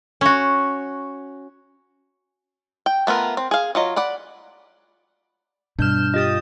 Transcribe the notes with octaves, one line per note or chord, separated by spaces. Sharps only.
C#4 F#4
G5
A3 B3 F4 A#4
C4
G#4 F5
F#3 F4 D#5
D5 F#5 B5
G2 B2 D4 F6 G6 E7
F4 G4 D#5 D#6 A6